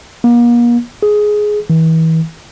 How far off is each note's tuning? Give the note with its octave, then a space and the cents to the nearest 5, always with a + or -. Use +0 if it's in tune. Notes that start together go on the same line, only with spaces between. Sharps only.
A#3 +40
G#4 +10
E3 -35